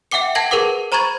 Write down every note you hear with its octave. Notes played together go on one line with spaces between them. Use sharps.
E5 F#5 G5 D6 C#7
F#5 G5 A5 G#6 A#6 F#7
G#4 A#4 B4 F#5 D6
C5 A#5 B5 C#6 G#6 A6